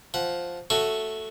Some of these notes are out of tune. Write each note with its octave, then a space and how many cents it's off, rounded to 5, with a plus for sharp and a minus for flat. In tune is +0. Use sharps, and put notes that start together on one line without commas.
F3 +0 F#5 +0
A3 +0 F#4 +0 C#5 +0